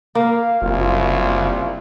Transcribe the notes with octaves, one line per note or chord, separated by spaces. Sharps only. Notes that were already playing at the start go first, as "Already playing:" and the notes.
A#3 F5
F#1 C2 F4